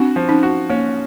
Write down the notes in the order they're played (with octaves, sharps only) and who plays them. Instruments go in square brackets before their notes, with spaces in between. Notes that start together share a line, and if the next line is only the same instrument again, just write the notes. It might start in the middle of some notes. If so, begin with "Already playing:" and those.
Already playing: [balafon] C4 D4 [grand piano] F#4
[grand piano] F3
[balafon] C#4 D#4
[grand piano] F#4
[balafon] A#3 [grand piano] C#4